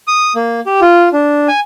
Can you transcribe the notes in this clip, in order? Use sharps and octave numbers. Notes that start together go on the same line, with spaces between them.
D#6
A#3
G4
F4
D4
G#5